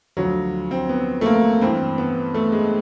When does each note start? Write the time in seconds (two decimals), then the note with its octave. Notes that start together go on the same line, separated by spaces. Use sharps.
0.17 D2 D3 F3 F#3
0.71 C4
0.89 B3
1.21 A3
1.26 A#3
1.61 G2 E3 C4
1.98 B3
2.34 A3
2.52 G#3